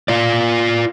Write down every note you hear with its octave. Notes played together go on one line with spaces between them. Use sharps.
F4 D5